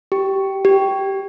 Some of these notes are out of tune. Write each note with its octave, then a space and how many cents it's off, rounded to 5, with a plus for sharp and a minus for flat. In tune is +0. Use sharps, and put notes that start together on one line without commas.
G4 -15
G4 -10